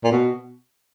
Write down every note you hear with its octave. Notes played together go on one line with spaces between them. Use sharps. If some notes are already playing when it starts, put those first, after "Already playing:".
A#2
B2